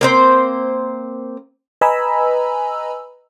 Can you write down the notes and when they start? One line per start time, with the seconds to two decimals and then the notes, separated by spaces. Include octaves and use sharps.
0.01 A#3 C4 C5
1.81 B4 D#5 G#5 A#5 B5 E6